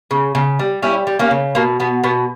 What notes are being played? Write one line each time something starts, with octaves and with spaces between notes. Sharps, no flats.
C#3
C#3
G3
G3 C#4 E4
G3
A#3 C#4
C#3
B2 A#3
B2 B3
B2 B3